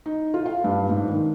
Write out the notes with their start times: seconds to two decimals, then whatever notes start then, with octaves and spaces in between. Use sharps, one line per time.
0.06 D#4
0.34 F4
0.46 F5
0.64 G2
0.89 G#2
1.09 D#3